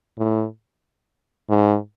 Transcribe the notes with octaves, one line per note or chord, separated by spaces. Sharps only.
A2
G#2